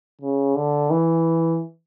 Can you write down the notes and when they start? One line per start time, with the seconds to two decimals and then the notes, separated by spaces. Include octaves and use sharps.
0.21 C#3
0.55 D3
0.90 E3